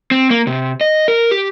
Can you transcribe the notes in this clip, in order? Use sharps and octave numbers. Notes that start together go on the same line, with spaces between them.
C4
A#3
C3
D#5
A#4
G4